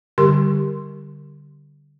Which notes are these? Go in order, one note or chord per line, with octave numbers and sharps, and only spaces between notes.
D3 G3 G4 A#4 C6